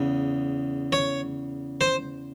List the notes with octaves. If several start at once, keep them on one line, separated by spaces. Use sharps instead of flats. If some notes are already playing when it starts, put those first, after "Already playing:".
Already playing: E2 C#3
C#5
C5